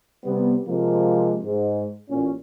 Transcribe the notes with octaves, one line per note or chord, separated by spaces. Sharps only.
C3 G3 B3
C3 F3 G#3 A#3
G#2
A1 A#2 C#4